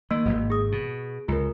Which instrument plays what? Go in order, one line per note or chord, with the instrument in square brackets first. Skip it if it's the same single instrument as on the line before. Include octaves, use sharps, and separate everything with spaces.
[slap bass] D#3 [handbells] A#3
[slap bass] D#1 G#1
[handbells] G#4 D#6
[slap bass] B2
[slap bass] C#2 [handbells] F4 A#4